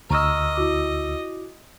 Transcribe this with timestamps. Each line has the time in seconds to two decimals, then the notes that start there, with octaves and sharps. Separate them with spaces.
0.10 D2 D#5 A#5 C#6 E6 F6
0.55 E4 F#4 D6